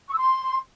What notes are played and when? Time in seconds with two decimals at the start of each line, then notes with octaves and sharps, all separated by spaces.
0.08 C#6
0.13 E6
0.18 C6